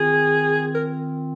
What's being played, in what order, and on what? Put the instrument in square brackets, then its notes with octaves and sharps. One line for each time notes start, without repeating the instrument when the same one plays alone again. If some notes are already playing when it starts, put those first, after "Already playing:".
Already playing: [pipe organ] D#3 C4 F4 [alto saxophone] G#4
[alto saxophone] A#4